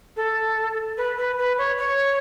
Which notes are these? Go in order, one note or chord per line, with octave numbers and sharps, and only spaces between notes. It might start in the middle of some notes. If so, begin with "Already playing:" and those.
A4
B4
B4
B4
C#5
C#5